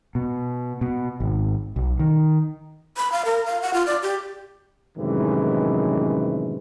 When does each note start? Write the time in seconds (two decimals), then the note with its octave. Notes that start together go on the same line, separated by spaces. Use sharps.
0.15 B2
0.81 B2
1.20 G#1
1.76 B1
1.99 D#3
2.97 B5
3.12 F5
3.25 A#4
3.46 F5
3.62 F#5
3.74 F4
3.87 D5
4.03 G4
4.98 F#2 A2 C3 D#3 E3 G#3